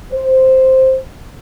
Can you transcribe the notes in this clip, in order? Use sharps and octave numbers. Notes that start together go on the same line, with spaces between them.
C5